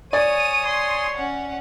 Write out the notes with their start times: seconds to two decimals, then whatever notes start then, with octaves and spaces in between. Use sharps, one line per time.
0.13 C#5 D5 G#5 D#6 D#7
0.66 C#5 C6
1.16 C#4 F#5